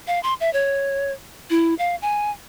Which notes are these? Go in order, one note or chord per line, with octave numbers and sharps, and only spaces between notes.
F5
C6
E5
C#5
E4
F5
G#5